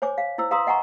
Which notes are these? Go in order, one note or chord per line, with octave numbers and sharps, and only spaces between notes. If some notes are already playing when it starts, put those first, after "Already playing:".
C5 C#5 G#5 D6
F5
E4 C5 E6
B4 F5 A#5 C6 D#6 E6
D#5 F#5 G#5 A#5 C#6